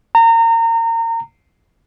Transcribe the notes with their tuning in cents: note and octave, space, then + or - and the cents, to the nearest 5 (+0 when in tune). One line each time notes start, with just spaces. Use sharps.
A#5 -30